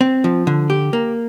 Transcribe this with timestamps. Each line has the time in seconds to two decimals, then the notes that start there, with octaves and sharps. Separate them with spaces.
0.01 C4
0.24 F3
0.47 D3
0.70 G4
0.93 A#3